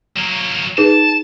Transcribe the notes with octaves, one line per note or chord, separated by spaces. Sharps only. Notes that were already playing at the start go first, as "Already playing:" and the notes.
F#3 A#3
D#4 G#4 B4 A5